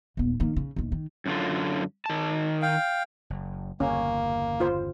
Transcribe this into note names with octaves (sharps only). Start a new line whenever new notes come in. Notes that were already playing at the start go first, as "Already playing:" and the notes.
D#1 B3
D#3 A#3
C#3
E1 D#2
D#3
F#2 D3 F4
D#3 A5
F5 G5
F#1
G1 E2 C#3 A#3 C#4
F4 C5